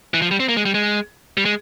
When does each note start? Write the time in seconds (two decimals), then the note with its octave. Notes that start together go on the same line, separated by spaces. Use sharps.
0.14 E3
0.22 F3
0.31 G3
0.40 C4
0.49 A#3
0.57 G#3
0.66 G3
0.74 G#3
1.37 G3
1.45 G#3